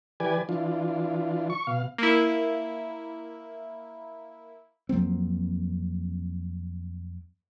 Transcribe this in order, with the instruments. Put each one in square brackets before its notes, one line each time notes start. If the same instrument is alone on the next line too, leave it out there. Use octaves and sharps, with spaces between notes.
[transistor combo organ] E3 G4 B4 D5 G#5
E3 D4 F4
C#6
B2 F5
[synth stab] A#3 E4
[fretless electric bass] F2 F#3 A#3 C4